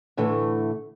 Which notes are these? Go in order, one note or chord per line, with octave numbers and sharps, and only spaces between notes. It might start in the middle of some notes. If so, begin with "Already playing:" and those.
A2 D3 E3 A3